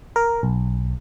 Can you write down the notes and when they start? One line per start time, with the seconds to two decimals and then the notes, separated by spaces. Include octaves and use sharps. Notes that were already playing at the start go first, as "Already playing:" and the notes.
0.16 A#4
0.43 B1